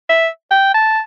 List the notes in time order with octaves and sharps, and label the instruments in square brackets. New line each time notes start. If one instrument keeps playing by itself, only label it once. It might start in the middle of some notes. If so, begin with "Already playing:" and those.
[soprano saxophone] E5
G5
A5